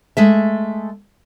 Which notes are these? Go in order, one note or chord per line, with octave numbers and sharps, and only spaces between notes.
G#3 A3 E5